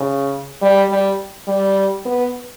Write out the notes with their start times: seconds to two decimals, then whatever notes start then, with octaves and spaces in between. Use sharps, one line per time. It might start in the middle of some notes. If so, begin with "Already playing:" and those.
Already playing: C#3
0.62 G3
0.90 G3
1.47 G3
2.05 B3